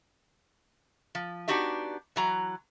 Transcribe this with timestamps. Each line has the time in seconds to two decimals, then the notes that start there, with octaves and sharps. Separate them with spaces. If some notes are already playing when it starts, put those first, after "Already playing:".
1.15 F3
1.48 B3 D4 D#4 F#4 G4 E5
2.16 E3 F#3 A#5